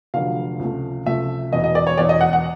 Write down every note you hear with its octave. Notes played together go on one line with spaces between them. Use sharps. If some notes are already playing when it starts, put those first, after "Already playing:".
F1 F2 D3 F#3 F5
C#2 C3 F3 A3
C#2 C3 F3 A3 E5
E1 E2 B2 D#5
D#5
D5
C#5
E1 E2 B2 D5
D#5
F#5
F#5